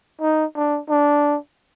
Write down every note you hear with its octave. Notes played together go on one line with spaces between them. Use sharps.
D#4
D4
D4